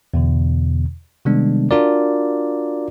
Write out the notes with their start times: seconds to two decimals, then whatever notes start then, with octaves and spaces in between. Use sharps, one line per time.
0.14 E2 B2 D3
1.25 C3 D#3 G3 G#3 B3 D4
1.71 D4 F4 F#4 A#4 D5